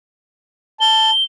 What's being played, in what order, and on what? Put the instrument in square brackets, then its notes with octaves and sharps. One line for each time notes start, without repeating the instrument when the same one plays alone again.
[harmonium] A5 [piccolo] G7